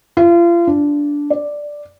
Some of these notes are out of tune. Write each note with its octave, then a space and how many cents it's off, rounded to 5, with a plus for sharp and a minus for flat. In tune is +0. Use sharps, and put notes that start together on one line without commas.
F4 -35
D4 -10
D5 +0